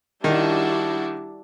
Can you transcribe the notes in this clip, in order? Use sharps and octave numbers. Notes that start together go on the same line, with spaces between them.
D#3 G3 D4 E4 F#4